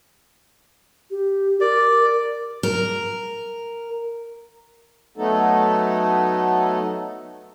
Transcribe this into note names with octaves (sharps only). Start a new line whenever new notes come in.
G4
A#4 D5
A#4
F#3 A3 B3 D#4 A4